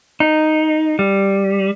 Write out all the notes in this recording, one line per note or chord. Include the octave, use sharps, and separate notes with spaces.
D#4
G3